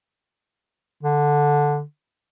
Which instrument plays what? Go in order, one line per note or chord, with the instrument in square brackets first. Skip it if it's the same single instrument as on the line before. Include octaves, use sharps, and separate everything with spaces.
[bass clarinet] D3